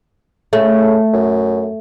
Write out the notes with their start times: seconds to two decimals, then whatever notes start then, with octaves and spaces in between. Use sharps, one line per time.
0.53 C#3 A3
1.13 F#2